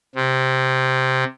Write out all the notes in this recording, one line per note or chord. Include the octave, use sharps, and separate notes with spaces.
C3